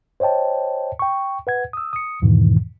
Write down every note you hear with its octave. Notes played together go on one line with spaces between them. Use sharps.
C5 C#5 D#5 G5 A5
G5 C#6
B4 F#5 G#6
D#6 E6
D#6 C#7
E2 G#2 B2 D#3 E3